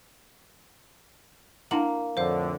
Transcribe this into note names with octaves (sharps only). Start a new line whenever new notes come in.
A#3 D4 E4 F#5 F#7
F2 A2 D3 C5 F5